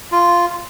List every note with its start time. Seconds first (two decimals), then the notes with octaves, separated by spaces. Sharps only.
0.12 F4